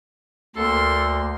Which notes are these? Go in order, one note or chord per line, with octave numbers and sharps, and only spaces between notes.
D2 A#3 A4 C6